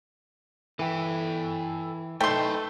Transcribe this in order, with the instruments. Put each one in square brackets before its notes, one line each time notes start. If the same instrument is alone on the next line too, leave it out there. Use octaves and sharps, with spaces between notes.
[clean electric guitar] E3 [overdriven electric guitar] A4 G5
[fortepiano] A3 [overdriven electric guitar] D#4 B4 [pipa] G5 C6